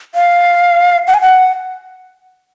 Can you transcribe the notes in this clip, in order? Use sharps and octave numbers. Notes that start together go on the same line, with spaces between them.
F5
F#5
G#5
F#5